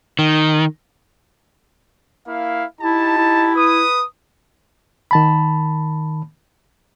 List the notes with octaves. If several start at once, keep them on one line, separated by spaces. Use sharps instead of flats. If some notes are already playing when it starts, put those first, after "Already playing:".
D#3
A#3 E4 F5
D#4 E4 G4 A5
E4
B4 D#6
D#3 A5 B5